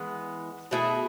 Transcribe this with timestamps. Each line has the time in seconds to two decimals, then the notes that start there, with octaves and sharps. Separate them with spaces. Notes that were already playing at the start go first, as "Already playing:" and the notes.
Already playing: E3 G#3 B3
0.71 B2 A3 E4 G#4